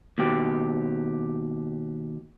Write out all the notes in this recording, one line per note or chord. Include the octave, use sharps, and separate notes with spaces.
D#2 B2 G4